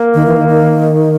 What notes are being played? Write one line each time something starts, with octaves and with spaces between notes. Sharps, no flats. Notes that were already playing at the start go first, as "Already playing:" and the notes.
Already playing: A#3
D#3
E3
D#3
D#3